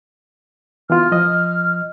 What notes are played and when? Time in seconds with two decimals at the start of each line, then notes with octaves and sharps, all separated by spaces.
0.90 E3 B3 F4 F6
1.12 F3 D#5